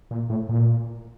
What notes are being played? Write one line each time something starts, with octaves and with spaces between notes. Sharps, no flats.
A#2
A2
A#2